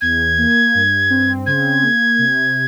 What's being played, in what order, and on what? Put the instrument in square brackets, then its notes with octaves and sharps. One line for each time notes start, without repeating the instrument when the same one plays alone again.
[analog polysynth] E2 [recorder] G#6
[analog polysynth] A#3
G2
C4
[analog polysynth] C#3 [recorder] G#6
[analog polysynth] A#3
C3